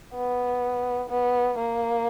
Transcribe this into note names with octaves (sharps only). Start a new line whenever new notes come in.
B3
B3
A#3